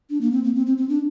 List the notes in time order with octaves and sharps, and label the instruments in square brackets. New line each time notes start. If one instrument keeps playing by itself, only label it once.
[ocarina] D4
A#3
C4
A#3
C4
C4
C4
D4